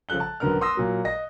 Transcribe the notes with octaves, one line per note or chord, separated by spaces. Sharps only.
C#3 F3 A4 F#6 G7
A5
E1 F#2 D3 B3 A#4 F6
C6 D#6 E6 A#6
A#2 F#3 A#4
D#5 A#6